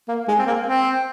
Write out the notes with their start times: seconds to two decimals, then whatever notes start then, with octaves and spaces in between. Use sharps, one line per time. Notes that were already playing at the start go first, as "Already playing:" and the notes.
0.08 A#3
0.28 G#3
0.39 C4
0.47 A#3
0.67 C4